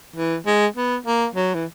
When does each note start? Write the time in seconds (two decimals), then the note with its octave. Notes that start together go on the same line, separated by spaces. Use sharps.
0.16 E3
0.46 G#3
0.76 B3
1.06 A#3
1.35 F#3
1.54 E3